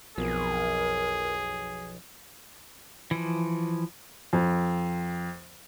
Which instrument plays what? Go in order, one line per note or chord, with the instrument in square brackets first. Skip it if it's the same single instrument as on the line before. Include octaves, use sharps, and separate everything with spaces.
[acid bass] B1 [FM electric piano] F2 B2 F3 [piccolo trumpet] G#4 [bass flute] A#4
[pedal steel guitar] E3 F3
[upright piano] F2